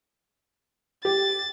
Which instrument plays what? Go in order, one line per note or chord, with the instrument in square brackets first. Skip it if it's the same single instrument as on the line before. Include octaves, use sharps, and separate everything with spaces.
[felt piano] G4 [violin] A6